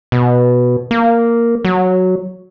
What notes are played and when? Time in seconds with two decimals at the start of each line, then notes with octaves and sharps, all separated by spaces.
0.12 B2
0.91 A#3
1.65 F#3